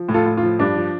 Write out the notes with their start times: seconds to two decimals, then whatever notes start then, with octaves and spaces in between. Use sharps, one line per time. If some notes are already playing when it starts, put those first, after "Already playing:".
Already playing: F3
0.09 A2
0.14 F4 A4
0.26 A2
0.37 F4
0.43 F3
0.59 G2 D4
0.76 F3